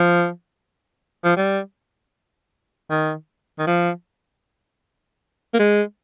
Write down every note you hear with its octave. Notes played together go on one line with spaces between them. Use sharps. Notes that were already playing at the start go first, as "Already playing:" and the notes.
Already playing: F3
F3
G3
D#3
D#3
F3
A#3
G#3